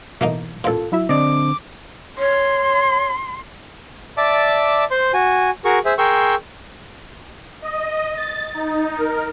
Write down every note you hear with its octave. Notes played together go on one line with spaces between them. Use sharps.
B2 E3 A3 A#3 D#4
A1 A#2 F4 A4
F#3 E4 E5
D3 C4 D5 D#5 D6
C#5 C6
D5 E5 A5 D6
C5 C6
F#4 G#5
F#4 G#4 A#4 C#6
G#4 C5 E5
G#4 A#4 G5 C6 C#6 E6
D#5
A6
D#4
A#4